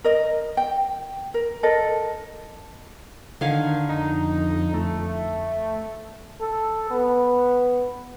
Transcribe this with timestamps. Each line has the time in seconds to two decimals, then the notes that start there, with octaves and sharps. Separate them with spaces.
0.04 A#4 D#5
0.57 G5
1.34 A#4
1.63 A4 A#4 D#5
3.41 D3 D#3 F5 G#5
3.89 F2 D#4
4.74 A3
6.41 A4
6.91 B3